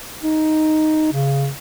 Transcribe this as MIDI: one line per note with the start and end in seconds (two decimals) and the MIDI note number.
0.23 1.08 63
1.13 1.49 49